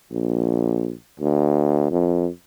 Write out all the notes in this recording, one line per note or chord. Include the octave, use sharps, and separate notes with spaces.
A#1
D2
F2